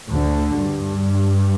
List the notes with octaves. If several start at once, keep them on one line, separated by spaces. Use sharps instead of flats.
D2 D3
G2